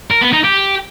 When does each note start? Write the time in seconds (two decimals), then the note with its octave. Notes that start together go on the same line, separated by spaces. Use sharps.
0.11 A#4
0.22 B3
0.33 D#4
0.44 G4